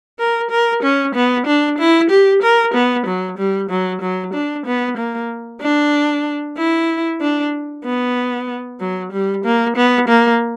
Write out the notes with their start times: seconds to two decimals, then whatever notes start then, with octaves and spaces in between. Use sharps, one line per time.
0.19 A#4
0.51 A#4
0.83 C#4
1.15 B3
1.46 D4
1.79 E4
2.10 G4
2.42 A#4
2.74 B3
3.06 F#3
3.38 G3
3.70 F#3
4.01 F#3
4.34 D4
4.66 B3
4.97 A#3
5.61 D4
6.57 E4
7.21 D4
7.85 B3
8.80 F#3
9.12 G3
9.45 A#3
9.76 B3
10.08 A#3